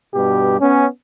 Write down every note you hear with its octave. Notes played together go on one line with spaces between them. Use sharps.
G2 B2 G4
B3 C#4